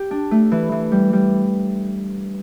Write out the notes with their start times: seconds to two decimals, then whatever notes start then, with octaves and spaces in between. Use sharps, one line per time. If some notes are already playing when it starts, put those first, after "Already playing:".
Already playing: G4
0.11 D4
0.31 A3
0.51 E3
0.72 E3
0.92 G3
1.13 G3